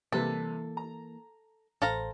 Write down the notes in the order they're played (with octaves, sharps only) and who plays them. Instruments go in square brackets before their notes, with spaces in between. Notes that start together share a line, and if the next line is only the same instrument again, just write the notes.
[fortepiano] C3 G3 B4 [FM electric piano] E3 A#3 [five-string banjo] A4
[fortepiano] A#5
[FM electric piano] A1 C5 [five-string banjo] A4 F5 A#5